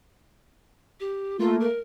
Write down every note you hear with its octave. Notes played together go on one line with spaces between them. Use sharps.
G4
A3 A#3 F4
A#4